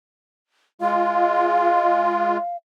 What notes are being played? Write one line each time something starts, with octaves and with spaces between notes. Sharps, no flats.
G#3 F4 F5